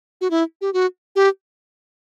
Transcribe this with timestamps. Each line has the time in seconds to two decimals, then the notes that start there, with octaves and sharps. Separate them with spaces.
0.21 F#4
0.30 E4
0.61 G4
0.73 F#4
1.16 G4